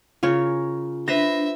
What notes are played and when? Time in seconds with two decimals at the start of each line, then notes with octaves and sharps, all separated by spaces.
0.23 C#3 F4 A#4 C#5
1.08 D4 B4 C5 E5 A#6